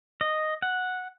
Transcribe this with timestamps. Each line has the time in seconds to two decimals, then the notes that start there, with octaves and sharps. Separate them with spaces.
0.21 D#5
0.62 F#5